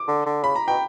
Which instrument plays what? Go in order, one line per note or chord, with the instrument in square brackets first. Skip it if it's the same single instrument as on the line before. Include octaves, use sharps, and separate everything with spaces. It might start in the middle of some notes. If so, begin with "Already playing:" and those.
Already playing: [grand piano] D6
[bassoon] D3
D3
[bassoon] C#3 [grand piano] B5
[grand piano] A#5
[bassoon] B2 [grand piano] G5